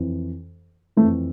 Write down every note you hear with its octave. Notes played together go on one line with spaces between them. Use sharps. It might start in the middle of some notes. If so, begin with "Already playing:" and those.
Already playing: F2 E3
E3 A3
F2